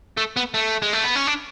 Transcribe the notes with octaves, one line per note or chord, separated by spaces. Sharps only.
A3
B3
A3
G#3
A3
B3
C#4
D4